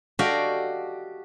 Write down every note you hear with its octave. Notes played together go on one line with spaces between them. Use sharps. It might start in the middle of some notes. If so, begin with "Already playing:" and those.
F#4 G4 A4 D5 D#5 F5